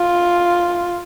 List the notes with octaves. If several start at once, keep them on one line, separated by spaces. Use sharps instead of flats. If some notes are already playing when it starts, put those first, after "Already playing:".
Already playing: F4